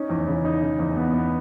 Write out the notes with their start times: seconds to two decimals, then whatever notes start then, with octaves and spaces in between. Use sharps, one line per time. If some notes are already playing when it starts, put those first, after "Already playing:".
Already playing: C#4 D#4
0.09 E2
0.27 C#3
0.44 D#4
0.62 C#3
0.79 E2
0.97 B3
1.14 B3